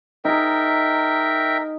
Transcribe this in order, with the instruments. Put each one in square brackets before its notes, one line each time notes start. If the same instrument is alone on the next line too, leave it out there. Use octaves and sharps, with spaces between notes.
[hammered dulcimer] D#4 G#4 [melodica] A#4 E5 G5